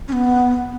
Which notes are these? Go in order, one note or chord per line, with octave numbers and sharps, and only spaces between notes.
C#4
B3